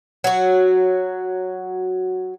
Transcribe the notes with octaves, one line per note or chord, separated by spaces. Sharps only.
F#3 F#4